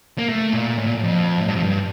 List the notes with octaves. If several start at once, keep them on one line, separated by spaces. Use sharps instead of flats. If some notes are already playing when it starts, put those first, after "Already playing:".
A#3
A3
A#2
A2
A#2
A2
F2
A2
G2
F2
G2